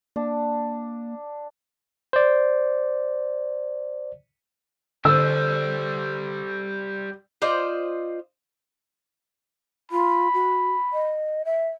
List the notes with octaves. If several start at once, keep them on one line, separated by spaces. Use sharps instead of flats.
A#3 D4
C5 D5
D3 G3 C4 A4 C5 E6
F4 C5 D5 D#5
F4 B5
F#4
D#5
E5